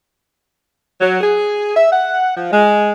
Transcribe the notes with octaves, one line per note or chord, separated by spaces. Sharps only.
F#3
G#4
E5
F#5
F3
G#3